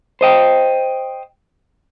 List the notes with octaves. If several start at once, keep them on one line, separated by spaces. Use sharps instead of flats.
C5 D#5 G5